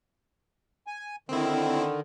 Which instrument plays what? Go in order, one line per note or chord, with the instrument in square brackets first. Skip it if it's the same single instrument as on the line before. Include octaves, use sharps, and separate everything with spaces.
[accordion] G#5
[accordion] D3 D#3 [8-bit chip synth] C4 E4